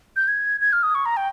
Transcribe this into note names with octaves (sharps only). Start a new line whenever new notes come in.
G6
G#6
G#6
F6
D#6
C#6
A#5
G5